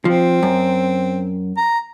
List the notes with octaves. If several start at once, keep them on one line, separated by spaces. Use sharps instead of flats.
F3 C4
F#2
A#5